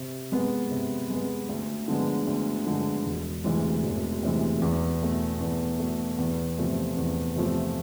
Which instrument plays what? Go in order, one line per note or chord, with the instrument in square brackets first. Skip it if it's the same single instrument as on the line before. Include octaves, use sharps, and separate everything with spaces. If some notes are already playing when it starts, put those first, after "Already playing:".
Already playing: [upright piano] C3
G#3 B3
C3
G#3 B3
D2
D3 F3 G#3 B3
D2
D3 F3 G#3 B3
E1
D2 C3 E3 G#3
E1
D2 C3 E3 G#3
E2
B2 A3
E2
B2 A3
E2
C3 F3 A3
E2
C3 F3 A3